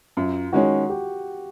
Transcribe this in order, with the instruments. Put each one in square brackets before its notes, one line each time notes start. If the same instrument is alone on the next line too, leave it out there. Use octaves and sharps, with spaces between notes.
[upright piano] F#2 [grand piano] F4
[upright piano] D#3 G#3 C#4 [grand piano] F#4
[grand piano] G4